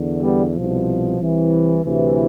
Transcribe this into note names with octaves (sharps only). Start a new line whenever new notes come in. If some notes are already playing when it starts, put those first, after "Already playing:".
Already playing: E2 D3
G3 B3
C2 B2 F3
C2 C3 E3
D2 C3 E3